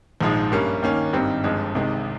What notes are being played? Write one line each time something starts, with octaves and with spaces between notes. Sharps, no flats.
A#1 G#2 F3 G#3
G2 G3 A#3 C#4
D#2 D#3 A#3 C#4
G#1 G2 G3 C4 D#4
G1 G2 F3 G#3
C2 C3 D#3 G#3